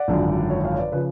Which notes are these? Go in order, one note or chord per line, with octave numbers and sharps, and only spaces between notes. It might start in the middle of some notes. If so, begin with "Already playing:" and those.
Already playing: D5 F#5
G#1 F#2 D3 F3
C#5
C#5 F5
C#5
B4 D5
C#3 F3 B4